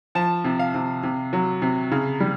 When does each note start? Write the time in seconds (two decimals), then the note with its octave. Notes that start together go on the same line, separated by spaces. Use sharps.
0.15 F3 A5
0.44 C3
0.59 F5
0.74 C3
1.03 C3
1.33 F#3
1.62 C3
1.91 C#3
2.20 G3